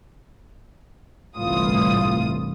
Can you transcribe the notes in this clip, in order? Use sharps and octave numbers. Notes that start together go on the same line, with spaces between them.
G1 C2 A2 E3 F4 D#6